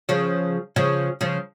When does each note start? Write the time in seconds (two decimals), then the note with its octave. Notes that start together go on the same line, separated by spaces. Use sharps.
0.09 C#3 F3
0.76 C#3 F3
1.21 C#3 F3